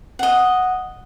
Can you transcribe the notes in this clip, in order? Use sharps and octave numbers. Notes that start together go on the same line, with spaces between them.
D#5 F#5